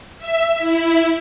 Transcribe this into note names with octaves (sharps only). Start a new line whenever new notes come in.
E5
E4